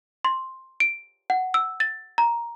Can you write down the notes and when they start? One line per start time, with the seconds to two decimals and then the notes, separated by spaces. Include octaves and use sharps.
0.25 C6
0.80 D7
1.30 F#5
1.54 E6
1.80 A6
2.18 A#5